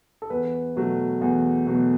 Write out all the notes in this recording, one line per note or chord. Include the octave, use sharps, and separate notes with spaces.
A4
E2 B4
B2 F#3 A3
E2
B2 F#3 A3